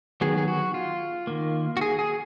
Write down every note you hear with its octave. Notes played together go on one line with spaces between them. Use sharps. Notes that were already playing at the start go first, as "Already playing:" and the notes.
D#3 F#3 B3 G#4
G#4
F#4
F4
D#3 A#3
F#4
G#4
G#4